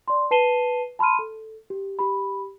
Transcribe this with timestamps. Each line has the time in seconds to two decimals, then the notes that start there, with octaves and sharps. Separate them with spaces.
0.08 D5 C6
0.31 B4 A5 C7 D#7 E7 G7
0.99 A5 B5 C6 F6 D#7
1.19 A4
1.70 G4
1.99 G4 B5